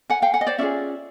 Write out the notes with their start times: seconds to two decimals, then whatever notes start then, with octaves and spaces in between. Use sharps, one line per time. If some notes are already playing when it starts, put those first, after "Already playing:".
0.10 F#5 G#5
0.22 F5 G5
0.34 F#5 G#5
0.41 D#5
0.47 C5 D5
0.58 C#4 F4 G#4 D5 E5